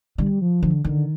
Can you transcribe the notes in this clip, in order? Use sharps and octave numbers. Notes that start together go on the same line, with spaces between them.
D3 G3
F3
D3 F3
D3 D#3